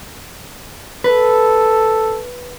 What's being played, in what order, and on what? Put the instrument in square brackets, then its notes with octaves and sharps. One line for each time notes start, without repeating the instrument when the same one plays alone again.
[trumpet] A4 [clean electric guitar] B4